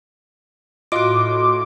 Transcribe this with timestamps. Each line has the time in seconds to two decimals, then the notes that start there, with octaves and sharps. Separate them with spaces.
0.92 A2 F4 F#4 D#5 C6 D6